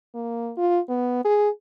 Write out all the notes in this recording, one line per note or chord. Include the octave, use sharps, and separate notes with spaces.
A#3
F4
B3
G#4